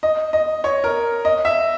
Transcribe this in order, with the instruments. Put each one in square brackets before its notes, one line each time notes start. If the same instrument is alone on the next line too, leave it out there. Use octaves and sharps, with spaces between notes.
[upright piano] D#5
D#5
C#5
A#4
D#5
E5